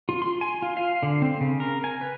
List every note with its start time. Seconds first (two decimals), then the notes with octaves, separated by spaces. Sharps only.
0.09 F4
0.22 C6
0.41 G#5
0.62 F4
0.77 F5
1.03 D3
1.22 C4
1.41 C#3
1.60 A#4
1.84 G#5
2.01 B4